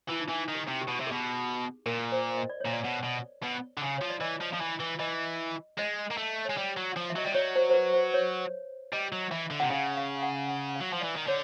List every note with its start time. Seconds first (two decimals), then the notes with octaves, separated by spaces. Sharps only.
0.09 E3 E4
0.20 D#4
0.29 E3 D4
0.48 D#3
0.55 G4
0.67 C3
0.81 G4
0.88 B2
1.00 C3
1.07 B2 G#4
1.86 A#2 A#4
2.12 C5
2.38 D#5
2.50 D5
2.60 A#2 C#5
2.73 D5
2.84 B2
3.03 B2
3.43 B2
3.78 D3
3.82 C#3
3.98 F3 C#5
4.10 D5
4.21 E3 D#5
4.41 F3
4.53 F3
4.60 E3
4.80 E3
4.99 E3 D#5
5.78 G#3 D#5
6.11 A#3
6.18 A3
6.45 G#3 C#5
6.57 G3 D5
6.77 F#3
6.96 F3
7.10 E5
7.16 F#3 D#5
7.24 G3 D5
7.32 F#3 C#5
7.55 C5
7.70 C5
7.74 B4
7.94 C5
8.14 C#5
8.93 G3 D#5
9.12 F#3
9.31 E3 E5
9.51 D3
9.60 C3 F#5
9.70 C#3 F5
9.97 F5
10.23 F#5
10.49 F#5
10.69 F#5
10.76 F5
10.81 F#3
10.93 F3
11.01 E3 D5
11.16 D#3
11.27 D3 C#5